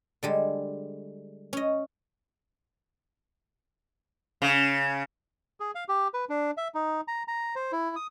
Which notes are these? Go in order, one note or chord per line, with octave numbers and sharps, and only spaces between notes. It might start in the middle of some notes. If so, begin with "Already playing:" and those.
D3 G3 G#3
C#4 D#5
C#3
G#4
F5
G4
B4
D4
E5
D#4
A#5
A#5
C5
E4
D#6